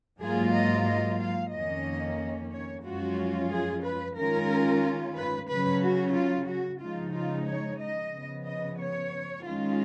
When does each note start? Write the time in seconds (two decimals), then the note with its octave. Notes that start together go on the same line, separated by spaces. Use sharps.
0.20 G#2 F#3 A#3 F4 G#4
0.53 D#5
0.86 D#5
1.19 F5
1.52 F2 D#3 A#3 C#4 D#5
2.51 C#5
2.84 F#2 F3 G#3 C#4 F4 F#4
3.50 G#4
3.84 B4
4.16 D#3 G#3 C#4 F4 A#4
5.15 B4
5.48 C#3 F#3 C#4 B4
5.81 F#4
6.14 F4
6.47 F#4
6.80 C#3 F3 G#3 D#4 F4
7.14 F4
7.47 C#5
7.79 D#5
8.12 C#3 F3 B3
8.45 D#5
8.78 C#5
9.44 D#3 G#3 C#4 F4